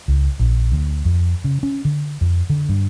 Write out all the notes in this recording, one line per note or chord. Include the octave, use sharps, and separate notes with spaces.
C#2
A#1
D2
F2
C#3
C#4
D3
F2
D3
G2